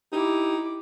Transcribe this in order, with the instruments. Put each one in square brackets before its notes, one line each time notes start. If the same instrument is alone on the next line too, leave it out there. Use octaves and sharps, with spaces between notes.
[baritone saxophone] D#4 [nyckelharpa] E4 D6 [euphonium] G4